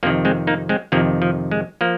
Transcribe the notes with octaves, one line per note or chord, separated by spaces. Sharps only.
F2 C3 D#3 F3 A#3
G#3 C4
A#3 D#4
G#3 C4
F2 C3 D#3 F3 A#3
F3
G#3
F3 A#3